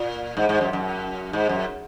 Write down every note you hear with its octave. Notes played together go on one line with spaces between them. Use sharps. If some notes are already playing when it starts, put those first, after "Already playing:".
Already playing: A#2
G#2
G#2
F#2
F#2
G#2
F#2